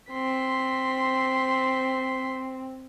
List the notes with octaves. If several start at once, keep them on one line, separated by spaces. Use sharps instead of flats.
C4 C6 B6